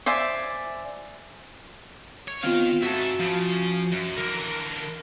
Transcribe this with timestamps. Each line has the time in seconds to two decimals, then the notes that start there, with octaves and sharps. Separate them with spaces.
0.06 C5 D5 E5 G#5
2.28 C#5
2.43 D#3 B3 C4 F4 F5
2.83 G#2 F#4 E5 A5
3.20 C#3 F3
3.92 F#2
4.17 D3 E3 A#4